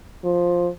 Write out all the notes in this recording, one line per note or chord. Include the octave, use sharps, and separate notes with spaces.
F3